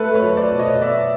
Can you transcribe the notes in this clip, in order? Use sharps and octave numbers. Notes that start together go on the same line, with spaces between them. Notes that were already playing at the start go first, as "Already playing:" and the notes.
Already playing: A3 A4 B4
B4 C#5
F#3
C5 D5
B2
C#5 D#5
B3 D5 E5